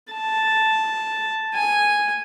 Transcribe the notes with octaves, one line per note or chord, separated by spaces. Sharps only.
A5
G#5